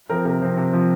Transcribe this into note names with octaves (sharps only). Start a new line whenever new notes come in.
F3 C4 A#4
C3 A#4
F3 C4 C5
C3
F3 C4